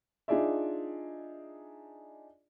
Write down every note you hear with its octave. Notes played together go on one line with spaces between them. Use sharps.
D4 D#4 F4 G#4 D5 E5